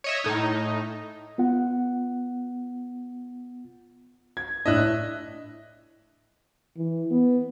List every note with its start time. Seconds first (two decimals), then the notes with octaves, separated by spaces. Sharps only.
0.04 C#5 D#5 E5
0.24 A2 D#4
1.38 B3 F4 F#5
4.37 G#6
4.66 A2 D4 D#5 E5 F#6
6.77 E3
7.11 B3